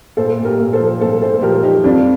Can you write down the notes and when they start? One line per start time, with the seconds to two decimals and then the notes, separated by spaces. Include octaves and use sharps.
0.17 A#2 A4 C5
0.39 A#2
0.45 G4 A#4
0.60 A#2
0.73 A4 C5
0.80 F3
1.00 A#2 A4 C5
1.22 A#2 A4 C5
1.39 C5
1.42 F3 G4 A#4
1.63 F3 D#4 G4
1.84 F2 D4 F4